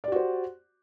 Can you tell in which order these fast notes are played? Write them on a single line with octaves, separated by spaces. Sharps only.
D5 G4 F#4 C5